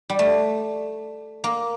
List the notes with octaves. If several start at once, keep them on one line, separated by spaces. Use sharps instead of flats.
G3
A3
A#3